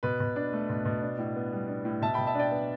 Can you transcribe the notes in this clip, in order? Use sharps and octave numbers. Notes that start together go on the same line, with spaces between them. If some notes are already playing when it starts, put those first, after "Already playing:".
B2 B4
B2
D4
A3
B2
B2
D4
A2
B3
G3
D4
A2
B2 E5 A5
B2 G5 B5
E5 A5
D4 D5 G5
B3